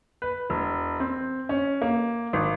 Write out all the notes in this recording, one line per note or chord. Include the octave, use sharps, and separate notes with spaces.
B4
E1
C4
C#4
A#3
G#1